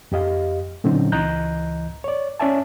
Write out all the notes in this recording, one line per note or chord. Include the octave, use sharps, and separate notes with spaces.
F2 G4 D#5 F5
A#2 D3 F#3 C4 C#4 D#4
C#2 E3 D#5 A#5 F#6 G6
C#5 D5
C#4 C#5 D5 E5 G#5 A5